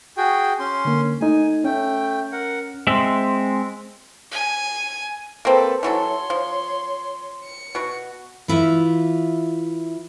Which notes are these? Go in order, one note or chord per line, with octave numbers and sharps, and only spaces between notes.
F#4 G#4 G5
C#4 C6
D3 A#3
A3 D#4 G#5
A3 C#4 G5
A#4 F#5
G#3 C4 E5
G#5
A#3 C4 A4 B4
E3 F#3 A4 C#5 C6
F3
C#7
B2 F#4
E3 E4 F4 E5